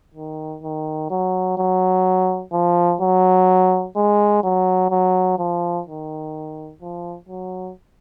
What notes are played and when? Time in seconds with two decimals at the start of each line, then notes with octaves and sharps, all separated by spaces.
0.15 D#3
0.63 D#3
1.11 F#3
1.58 F#3
2.53 F3
3.01 F#3
3.96 G#3
4.44 F#3
4.91 F#3
5.39 F3
5.87 D#3
6.81 F3
7.29 F#3